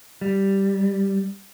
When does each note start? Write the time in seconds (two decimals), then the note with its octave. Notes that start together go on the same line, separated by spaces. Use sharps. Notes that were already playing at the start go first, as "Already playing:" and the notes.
0.21 G3